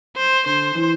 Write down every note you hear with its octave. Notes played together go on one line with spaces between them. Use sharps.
C5
D3 C5
E3